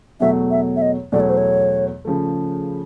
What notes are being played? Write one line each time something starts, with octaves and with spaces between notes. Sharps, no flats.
E2 B2 F#3 A3 E5
E5
E5
D#5
E2 B2 F#3 A3 D5
C#5
C5
C#5
C#3 F3 A3